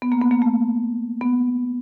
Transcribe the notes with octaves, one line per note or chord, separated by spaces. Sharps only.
B3
A#3
B3
A#3
A3
B3